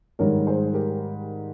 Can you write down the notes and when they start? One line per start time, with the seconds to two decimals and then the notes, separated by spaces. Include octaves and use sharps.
0.19 G#2 D#3 G3 A#4 C#5
0.47 G#4 C5
0.74 G4 A#4